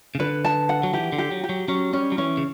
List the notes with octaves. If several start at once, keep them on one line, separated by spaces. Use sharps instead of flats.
C#3
D3 B4
A5
F#5
F#3
E3 G4
D3
G4
F#3
G4
F#3
F#3 C#4
G3 C#4
F#3
E3 C#4
C#3